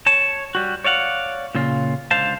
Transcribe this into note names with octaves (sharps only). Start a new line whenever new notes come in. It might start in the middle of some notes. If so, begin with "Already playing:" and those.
C#5 A5
G3 F#4
C#5 D5 F5 F#5
A#2 C#3 F4
C#2 D3 C5 F5 A5